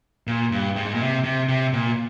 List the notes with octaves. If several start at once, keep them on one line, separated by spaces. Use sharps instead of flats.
A#2
G2
G#2
A#2
C3
C3
C3
A#2